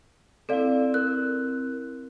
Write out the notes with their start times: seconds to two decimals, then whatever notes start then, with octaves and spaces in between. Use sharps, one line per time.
0.49 C4 E4 A4 D5 F5
0.94 A#4 F#6